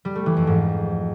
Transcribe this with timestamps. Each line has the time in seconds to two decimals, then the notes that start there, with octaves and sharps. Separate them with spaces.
0.05 G3
0.15 A3
0.26 E3
0.37 F2
0.47 G#2